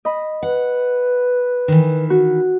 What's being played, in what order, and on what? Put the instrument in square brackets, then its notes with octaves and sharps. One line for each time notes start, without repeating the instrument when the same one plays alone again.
[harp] D#5 B5
[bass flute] B4 [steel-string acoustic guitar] F#5
[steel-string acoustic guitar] D#3 E3
[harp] F#4